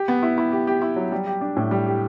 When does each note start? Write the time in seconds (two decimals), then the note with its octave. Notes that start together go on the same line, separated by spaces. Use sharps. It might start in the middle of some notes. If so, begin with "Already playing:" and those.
Already playing: G4
0.08 B3
0.23 E4
0.38 E4
0.52 G4
0.67 G4
0.82 E4
0.96 F#3
1.12 G3
1.27 G4
1.41 D4
1.57 A2
1.71 G3
1.86 G4